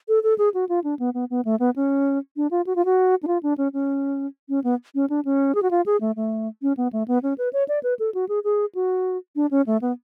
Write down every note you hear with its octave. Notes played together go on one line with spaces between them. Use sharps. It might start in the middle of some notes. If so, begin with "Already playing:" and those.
A4
A4
G#4
F#4
F4
D4
B3
B3
B3
A3
B3
C#4
D4
F4
F#4
F4
F#4
D4
F4
D4
C#4
C#4
C#4
B3
C#4
D4
C#4
G#4
F#4
F4
G#4
A3
A3
C#4
B3
A3
B3
C#4
B4
C#5
D5
B4
A4
F#4
G#4
G#4
F#4
D4
C#4
A3
B3